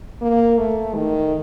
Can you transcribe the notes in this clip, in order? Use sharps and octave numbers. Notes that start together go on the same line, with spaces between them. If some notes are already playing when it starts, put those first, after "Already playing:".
A#3
A3
D#3